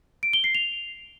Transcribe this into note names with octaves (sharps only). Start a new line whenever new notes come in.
D7
G7
C7
F7